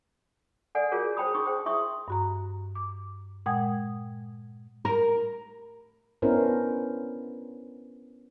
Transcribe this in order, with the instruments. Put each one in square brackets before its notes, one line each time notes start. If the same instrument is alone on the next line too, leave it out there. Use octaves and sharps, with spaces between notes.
[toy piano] A4 D5 F#5 G#5
F4 F#4 G#4 A#4 C#5
C5 C#5 G5 A5 B5 D#6
D#4 G#4 C#6 D#6
C5 G5
E4 E5 C6 C#6 D#6
[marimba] G2 F#4 A#5
D6
A#2 G#3 F#5 G5 D#6 G#6
[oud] A#4
[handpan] B3 C#4 D4 E4 A#4 C5